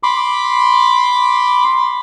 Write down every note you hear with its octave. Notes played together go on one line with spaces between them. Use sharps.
B5 C6 D6